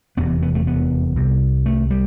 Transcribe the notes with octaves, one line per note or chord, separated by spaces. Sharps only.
F1 E2 C3 B3
B3
A3
B3
C2 C3
A3
G3